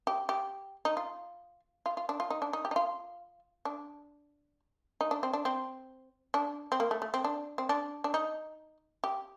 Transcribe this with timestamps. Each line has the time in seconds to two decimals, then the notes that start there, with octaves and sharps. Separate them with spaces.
0.07 G4
0.29 G4
0.85 D#4
0.97 F4
1.86 F4
1.97 F4
2.09 D4
2.20 F4
2.30 D#4
2.42 D4
2.53 D#4
2.65 G4
2.71 D#4
2.76 F4
3.65 D4
5.01 D#4
5.11 D4
5.23 C4
5.33 D4
5.45 C4
6.34 D4
6.72 C4
6.80 A#3
6.91 A3
7.02 A3
7.14 C4
7.24 D4
7.58 C4
7.69 D4
8.04 D4
8.14 D#4
9.04 G4